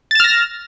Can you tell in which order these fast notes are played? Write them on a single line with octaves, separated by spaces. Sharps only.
A6 E7 F6 A#6